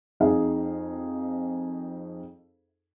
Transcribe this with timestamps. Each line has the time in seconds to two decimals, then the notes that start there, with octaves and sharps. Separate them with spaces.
0.20 F2 D#4 G#4 F5